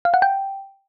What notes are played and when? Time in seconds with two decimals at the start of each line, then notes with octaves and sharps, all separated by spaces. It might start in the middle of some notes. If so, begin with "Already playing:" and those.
0.05 F5
0.14 F#5
0.22 G5